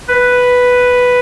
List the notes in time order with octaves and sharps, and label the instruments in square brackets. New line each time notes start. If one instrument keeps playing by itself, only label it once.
[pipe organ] B4